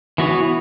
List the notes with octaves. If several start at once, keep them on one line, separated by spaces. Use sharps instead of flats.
E3 B3 F#4 C#5